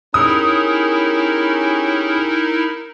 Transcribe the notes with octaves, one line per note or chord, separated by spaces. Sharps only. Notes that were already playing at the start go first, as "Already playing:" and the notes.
C#4 D#4 E4 G4 G#4 A#4 D#6